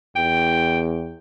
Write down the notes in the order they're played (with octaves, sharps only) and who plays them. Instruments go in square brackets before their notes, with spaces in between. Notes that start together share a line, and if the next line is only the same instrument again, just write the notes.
[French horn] E2 [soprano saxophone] G5